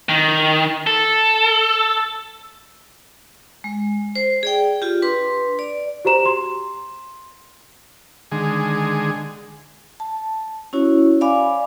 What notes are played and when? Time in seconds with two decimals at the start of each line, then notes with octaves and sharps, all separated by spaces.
0.09 D#3
0.87 A4
3.64 G#3
4.16 C5
4.43 G#4 D5 G5
4.82 F4 G4
5.02 D4 B4 C6
5.59 D5
6.05 F#4 G4 C5 A#5 E7
6.25 C6
8.32 D3 D#3 G#3 G#4
10.00 A5
10.73 C#4 E4 F#4 C#5
11.21 D5 F5 G#5 B5 D6